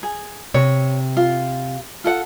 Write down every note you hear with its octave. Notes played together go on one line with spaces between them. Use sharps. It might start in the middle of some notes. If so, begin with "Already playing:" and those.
G#4
C3 C#5
F4
F4 A4 F#5